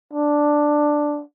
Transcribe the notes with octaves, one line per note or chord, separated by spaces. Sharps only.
D4